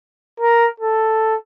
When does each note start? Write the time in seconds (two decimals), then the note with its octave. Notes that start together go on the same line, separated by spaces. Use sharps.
0.40 A#4
0.80 A4